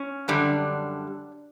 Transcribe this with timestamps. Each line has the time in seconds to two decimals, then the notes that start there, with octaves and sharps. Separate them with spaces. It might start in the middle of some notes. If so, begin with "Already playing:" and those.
Already playing: C#4
0.28 F#2 D3 G3 D4